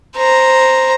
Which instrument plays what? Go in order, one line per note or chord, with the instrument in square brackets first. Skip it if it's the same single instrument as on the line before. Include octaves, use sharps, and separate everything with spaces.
[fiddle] C5 A#5